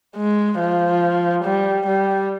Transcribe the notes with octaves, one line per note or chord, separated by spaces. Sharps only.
G#3
F3
G3
G3